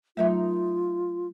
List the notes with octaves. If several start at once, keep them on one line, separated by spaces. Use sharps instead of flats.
F#3 A3 D#4 F4 A#4 E5